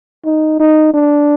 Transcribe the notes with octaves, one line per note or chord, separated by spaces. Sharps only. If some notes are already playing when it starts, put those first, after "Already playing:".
D#4
D#4
D4